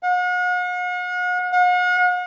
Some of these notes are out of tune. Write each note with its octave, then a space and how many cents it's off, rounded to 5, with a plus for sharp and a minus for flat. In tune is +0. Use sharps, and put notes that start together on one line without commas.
F#5 -45
F#5 -45